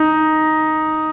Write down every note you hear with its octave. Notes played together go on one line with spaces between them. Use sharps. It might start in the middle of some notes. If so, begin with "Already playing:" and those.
Already playing: D#4